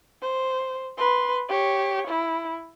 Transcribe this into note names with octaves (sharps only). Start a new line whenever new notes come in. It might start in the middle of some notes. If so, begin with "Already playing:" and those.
C5
B4 C6
G4 C#5
E4